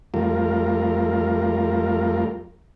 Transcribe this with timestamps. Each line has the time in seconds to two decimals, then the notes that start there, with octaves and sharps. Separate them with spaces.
0.14 F2 G3 A3 F4 A#4